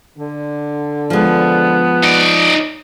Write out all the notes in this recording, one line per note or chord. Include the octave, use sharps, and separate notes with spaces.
D3
F3 G#3 B3
D#4 D5